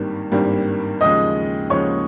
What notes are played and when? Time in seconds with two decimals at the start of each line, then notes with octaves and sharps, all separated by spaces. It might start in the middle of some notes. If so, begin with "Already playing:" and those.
Already playing: G#1 G2 D#3 G3 A#3
0.32 G#1 G2 D#3 G3 A#3
1.01 D#2 C#3 F3 G#3 D#5 D#6
1.70 D#2 C#3 F3 G#3 C#5 C#6